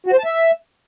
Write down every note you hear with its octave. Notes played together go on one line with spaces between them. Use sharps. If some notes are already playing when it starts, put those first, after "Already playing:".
F#4
C5
A5
E5